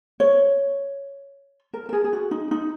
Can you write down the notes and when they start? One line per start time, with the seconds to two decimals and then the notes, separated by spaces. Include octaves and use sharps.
0.20 C#5
1.74 A#4
1.89 A#4
1.93 G#4
2.04 G#4
2.13 F#4
2.31 D#4
2.51 D#4